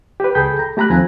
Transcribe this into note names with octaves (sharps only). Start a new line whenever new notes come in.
G4 B4
C#2 G#4 A4 G5 B5 G6
A#5
A3 G4 A#5 B5 F#6
D#2 F3 C4 G#5 A#5